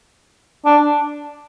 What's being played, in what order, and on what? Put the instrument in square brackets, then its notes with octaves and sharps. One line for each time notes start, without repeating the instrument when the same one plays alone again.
[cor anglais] D4